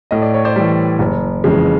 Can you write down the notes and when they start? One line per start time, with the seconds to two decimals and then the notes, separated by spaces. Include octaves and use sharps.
0.11 A2 D#5
0.22 D5
0.34 C#5
0.45 C5 D5
0.56 E3 G3
0.99 F#1
1.44 F2 C#3 E3 G#3